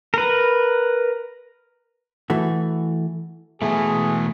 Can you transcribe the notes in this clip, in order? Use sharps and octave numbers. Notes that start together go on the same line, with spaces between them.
A#4 B4
E3 A3 F#4
B2 E3 A3 G#4